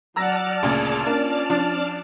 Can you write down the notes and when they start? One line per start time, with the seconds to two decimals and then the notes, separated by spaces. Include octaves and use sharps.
0.16 F#3 D5 F#5 A5 A#5 E6 F6 A#6
0.63 D2 A#2 C#3 G#4
1.06 A#3 C#4 D4 F4
1.50 F3 D4